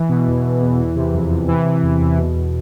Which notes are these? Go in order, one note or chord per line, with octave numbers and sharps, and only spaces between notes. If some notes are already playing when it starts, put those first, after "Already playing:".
Already playing: E3
B2
E2
E2
E2
E3
C3
F2
F2
C3 E3
C3
E2
E2
B2
E2